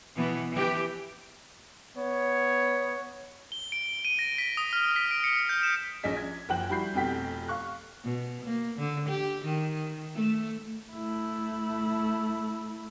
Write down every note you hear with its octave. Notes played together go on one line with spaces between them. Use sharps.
B2 E3 B3
E3 G4
B3 C#5
G7
D7
D#7
A#6
B6
D#6
F6
B6
D7
C#7
G6
E7
A#1 C#4 G#4 D#5 B6
G#6
F#1 F3 G5 F#6 F#7
G3 E4 F#4 B5 G6 C7
F1 F2 B2 G4 G5 B6
F5 C#6 F#6
B2
A#3
D3
G4
D#3
A3
A3 E4